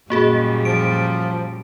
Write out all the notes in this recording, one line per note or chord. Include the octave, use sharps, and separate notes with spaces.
F#2 A#2 G3 A#3 F#4 G#4
F3 D7